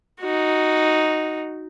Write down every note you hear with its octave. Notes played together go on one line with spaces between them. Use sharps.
D#4 F#4